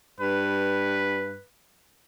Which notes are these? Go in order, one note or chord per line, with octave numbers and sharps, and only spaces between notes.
G2 B4